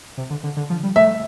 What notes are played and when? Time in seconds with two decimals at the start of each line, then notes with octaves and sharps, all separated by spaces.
0.18 C3
0.30 D3
0.44 D3
0.57 D3
0.70 F3
0.83 G3
0.96 A3 E5